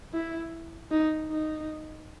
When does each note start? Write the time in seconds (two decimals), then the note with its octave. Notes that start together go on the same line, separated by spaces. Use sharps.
0.13 E4
0.91 D#4
1.29 D#4